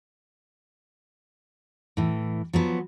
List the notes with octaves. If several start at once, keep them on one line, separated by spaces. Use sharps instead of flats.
A2 E3
F3 F#3 B3